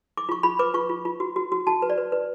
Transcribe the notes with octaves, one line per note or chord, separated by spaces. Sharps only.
D6
F4 C#6
F4 B5
B4 D6
F4 C#6
F4
F4
F#4
F#4
F#4
F#4 A5
B4
D5
B4
B4